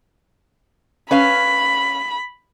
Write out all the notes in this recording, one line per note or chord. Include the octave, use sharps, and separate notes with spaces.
C#4 B4 F5 B5